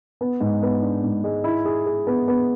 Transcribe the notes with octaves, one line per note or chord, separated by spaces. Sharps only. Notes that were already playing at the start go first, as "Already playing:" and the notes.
B3
G#2
B3
D4
G#2
G#3
E4
G#4
G#4
B3
B3